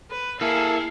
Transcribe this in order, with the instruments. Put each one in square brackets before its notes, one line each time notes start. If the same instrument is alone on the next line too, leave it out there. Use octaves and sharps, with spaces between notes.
[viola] B4
[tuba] A#3 [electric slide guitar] E4 [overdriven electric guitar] G#4 A4 [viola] F5